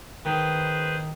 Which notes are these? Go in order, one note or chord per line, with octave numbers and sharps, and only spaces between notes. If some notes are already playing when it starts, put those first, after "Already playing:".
D#3 G#4 B4 C5